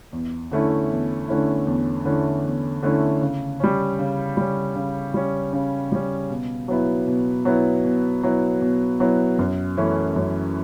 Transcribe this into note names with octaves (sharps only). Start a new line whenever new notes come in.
E2
D3 A3 C#4 E4
E2
D3 A3 C#4 E4
E2
D3 A3 C#4 E4
E2
D3 A3 C#4 E4
C#3
G3 C#4
C#3
G3 C#4
C#3
G3 C#4
C#3
G3 C#4
B2
F#3 B3 E4
B2
F#3 B3 E4
B2
F#3 B3 E4
B2
F#3 B3 E4
F#2
E3 A3 C#4 E4
F#2